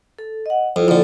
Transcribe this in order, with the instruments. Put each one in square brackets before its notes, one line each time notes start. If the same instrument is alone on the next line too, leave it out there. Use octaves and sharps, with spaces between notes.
[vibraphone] A4
D#5 F#5
[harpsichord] F2 [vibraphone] E4 F4 C5
[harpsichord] F2 D3 [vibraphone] A#3 A4 D5